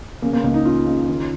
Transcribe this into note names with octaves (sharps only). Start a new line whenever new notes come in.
C#3 A#3
A#3
C#2 A#3
D#4
C#3 F4
C#3
D#3